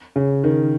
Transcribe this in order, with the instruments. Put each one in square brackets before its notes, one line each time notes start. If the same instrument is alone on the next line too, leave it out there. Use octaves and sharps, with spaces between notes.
[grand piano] C#3
D#3